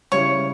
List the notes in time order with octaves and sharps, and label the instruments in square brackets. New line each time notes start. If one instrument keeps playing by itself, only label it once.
[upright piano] C#3 G3 C#4 E4 [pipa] C#5